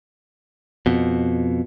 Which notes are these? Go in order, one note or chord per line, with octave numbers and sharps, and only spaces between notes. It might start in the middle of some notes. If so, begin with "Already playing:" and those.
F2 B2